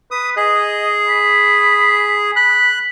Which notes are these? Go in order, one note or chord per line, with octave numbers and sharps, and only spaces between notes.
B4 D#6
G#4 D#5
B5
B5 F#6